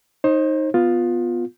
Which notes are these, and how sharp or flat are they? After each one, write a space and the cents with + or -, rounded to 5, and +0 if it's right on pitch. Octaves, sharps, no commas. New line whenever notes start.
D#4 +5 C5 +35
B3 +0 F4 +10